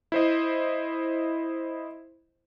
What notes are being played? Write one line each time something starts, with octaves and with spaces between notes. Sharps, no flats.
E4 C5 D#5